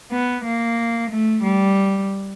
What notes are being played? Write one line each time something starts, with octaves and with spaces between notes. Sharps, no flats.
B3
A#3
A3
G3